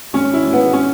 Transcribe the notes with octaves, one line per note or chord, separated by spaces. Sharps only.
G#1 C#4
E4
G#1
B3
C#4